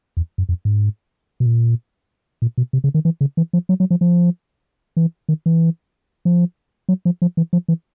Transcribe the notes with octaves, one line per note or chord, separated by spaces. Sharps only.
E2
F#2
F2
G#2
B2
A#2
A#2
B2
C3
C#3
D#3
E3
C#3
E3
F3
F#3
F#3
F3
F3
E3
D#3
E3
F3
F#3
F3
F3
E3
F3
E3